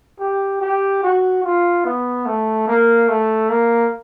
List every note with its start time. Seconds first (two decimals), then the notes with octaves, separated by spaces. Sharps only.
0.20 G4
0.61 G4
1.03 F#4
1.44 F4
1.85 B3
2.26 A3
2.68 A#3
3.08 A3
3.50 A#3